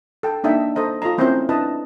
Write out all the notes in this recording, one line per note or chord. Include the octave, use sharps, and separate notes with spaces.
A4 G5
A#3 D4 D#4 E5 G5
A4 C5 D#5 A#5
F4 A4 D#5 A#5
A3 C4 C#4 E4 A#4 C5
D4 E4 B4 D#5 A5